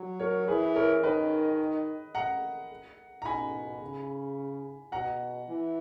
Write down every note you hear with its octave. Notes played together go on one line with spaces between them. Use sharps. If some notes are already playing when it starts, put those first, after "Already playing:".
Already playing: F#3
A#4 C#5
E3 G#4 B4
A#4 C#5
D#3 B4 D#5
F#5 A#5
A#5
B2 G#5 B5
C#3
B2 F#5 A#5
E3